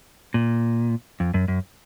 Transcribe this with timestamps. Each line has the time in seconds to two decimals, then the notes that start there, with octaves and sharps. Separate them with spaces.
0.34 A#2
1.20 F2
1.34 F#2
1.48 F#2